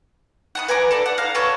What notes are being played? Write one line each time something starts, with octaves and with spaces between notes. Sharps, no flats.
F#5 A5 D#6
B4 G#5 A#5 D6
A4 D5
F#5
F5 A#5
A4 B4 C#5 A5